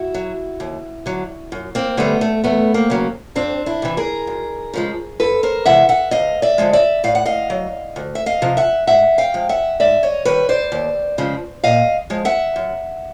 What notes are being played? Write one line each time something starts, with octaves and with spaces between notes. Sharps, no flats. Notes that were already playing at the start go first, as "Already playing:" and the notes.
Already playing: E4 F#4
F#3
D#2
D3 F#3
F#2
A#3 C4
D3 G3 A3 B3
A3
E2 A3 B3
A#3 C4
C#3 F#3
F2 C4 D4
D4 E4
C3 E3
G#4 A#4
F#2
C#3 F3 G#3
F2 A4 B4
A#4 C5
C3 E3 G#3 E5 F#5
E5 F#5
D2 D#5 F5
D5 E5
D3 F3 G#3
D5 E5
A2 F5
F#5
D#5 F5
F#3
D2
E5
D#5 F5
C3 F3
E5 F#5
G#2 E5 F#5
F5 G5
F3 G#3
E5 F#5
G#2 D5 E5
C#5 D#5
D#3 G3 B4 C#5
C5 D5
D#2
C#3 F3 G#3
A#2 D#5 F5
F3 G#3
E5 F#5
F#2